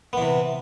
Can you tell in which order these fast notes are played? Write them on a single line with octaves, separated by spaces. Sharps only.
B3 E3 C3